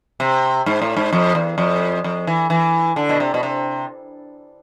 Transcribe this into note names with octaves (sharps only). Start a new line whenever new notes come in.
C3
G#2
A2
G#2
F2
E2
F2
F2
E3
E3
D3
B2
C3
B2
C3